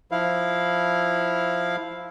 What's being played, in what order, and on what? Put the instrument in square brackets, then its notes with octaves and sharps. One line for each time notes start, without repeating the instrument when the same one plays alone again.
[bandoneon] F3 E4 F5